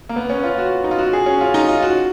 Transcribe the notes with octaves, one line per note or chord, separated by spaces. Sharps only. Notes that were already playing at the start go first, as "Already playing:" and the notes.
A#3
B3
C#4
F4
F#4
D#4
F4
F#4
G#4
C#4
F4
D#4
F4
F#4